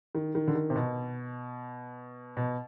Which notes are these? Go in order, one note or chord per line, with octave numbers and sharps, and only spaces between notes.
D#3
D#3
D3
D#3
C3
B2
B2